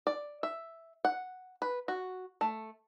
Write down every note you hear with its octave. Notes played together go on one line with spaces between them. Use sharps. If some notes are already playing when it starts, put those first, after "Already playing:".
D5
E5
F#5
B4
F#4
A3